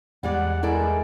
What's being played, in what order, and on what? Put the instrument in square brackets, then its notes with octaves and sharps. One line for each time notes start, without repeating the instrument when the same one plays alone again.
[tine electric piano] E2 [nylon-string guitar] G3 G#3 D5 [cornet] F#5
[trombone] G#3 [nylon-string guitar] E4 A4 D5 [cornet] A#4